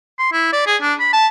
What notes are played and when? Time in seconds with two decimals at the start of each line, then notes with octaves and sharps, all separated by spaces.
0.19 C6
0.33 E4
0.53 D5
0.67 G#4
0.82 D4
1.00 B5
1.13 A5